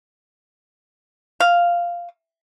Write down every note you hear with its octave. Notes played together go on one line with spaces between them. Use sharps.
F5